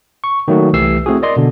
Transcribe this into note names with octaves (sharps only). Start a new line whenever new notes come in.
C#6
D#3 F#3 A3 A#3 F#4
C2 E3 A3 G4 E6 C7
A3 C4 E4 F#4 G#4
A#4 D5 D#5 C6
B2 D3